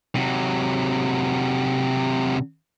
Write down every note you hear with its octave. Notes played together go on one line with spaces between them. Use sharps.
C3 F#3